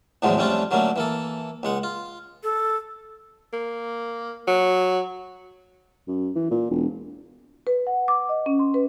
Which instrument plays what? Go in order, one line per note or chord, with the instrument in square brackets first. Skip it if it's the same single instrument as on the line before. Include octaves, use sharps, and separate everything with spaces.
[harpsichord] E2 A2 D3 F3 F#3 G#3
F2 G3 A3 C#4 D4 F4
D3 F#3 A3 A#3 C#4
E3 A#3 A4
C#2 G#3 F#5
F4
[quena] A4
[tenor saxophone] A#3
F#3
[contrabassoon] F#2
E3
A#2
E1
[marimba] B4
F#5
D6
D#5
C#4
C6
B4